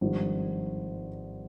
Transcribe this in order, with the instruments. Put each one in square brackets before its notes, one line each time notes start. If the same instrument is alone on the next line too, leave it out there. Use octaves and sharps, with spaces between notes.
[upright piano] G#1 G2 F3